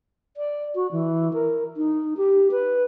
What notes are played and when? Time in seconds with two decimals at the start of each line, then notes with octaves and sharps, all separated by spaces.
0.37 D5
0.75 F#4
0.92 E3
1.33 A#4
1.77 D#4
2.17 G4
2.51 B4